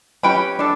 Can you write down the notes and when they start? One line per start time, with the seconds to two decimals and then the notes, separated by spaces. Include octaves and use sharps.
0.23 C#4 G4 B4 G5 B5
0.59 D4 A4